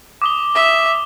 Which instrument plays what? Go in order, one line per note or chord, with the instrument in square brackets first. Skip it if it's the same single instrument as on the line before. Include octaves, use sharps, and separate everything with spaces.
[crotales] D6 D#6 G7
[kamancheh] E5